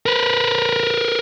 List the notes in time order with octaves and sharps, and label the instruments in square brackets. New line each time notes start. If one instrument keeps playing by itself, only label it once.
[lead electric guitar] A#4 B4